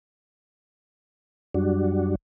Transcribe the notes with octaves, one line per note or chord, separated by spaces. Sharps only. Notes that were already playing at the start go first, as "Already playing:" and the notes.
F#2 G3 D4 F#4